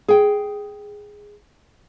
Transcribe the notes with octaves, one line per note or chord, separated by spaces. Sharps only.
G#4 G5